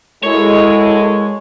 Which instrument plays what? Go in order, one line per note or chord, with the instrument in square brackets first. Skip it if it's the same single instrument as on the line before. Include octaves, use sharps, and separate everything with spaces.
[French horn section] G#3 [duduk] E4 [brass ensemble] F#4 A4 A#4 [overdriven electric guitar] C#5